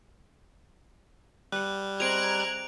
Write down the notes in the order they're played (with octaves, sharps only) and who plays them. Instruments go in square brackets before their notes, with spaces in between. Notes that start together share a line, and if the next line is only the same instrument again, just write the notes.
[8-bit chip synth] G3 [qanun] B4 F#5 [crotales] F#6
[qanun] C4 G#4 D#5 [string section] A#5 F#6 G#6 [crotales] D7 F7